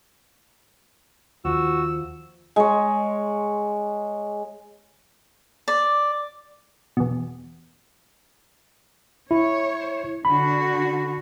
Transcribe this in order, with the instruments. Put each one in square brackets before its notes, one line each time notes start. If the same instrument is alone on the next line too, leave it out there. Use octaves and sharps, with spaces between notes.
[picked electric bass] D#2 [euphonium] F3 [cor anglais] F#4 [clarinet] E6
[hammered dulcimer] G#3 C#5
[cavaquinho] D5
[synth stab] E2 B2
[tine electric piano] E4 [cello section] C#5
[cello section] D3 F#4 [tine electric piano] B5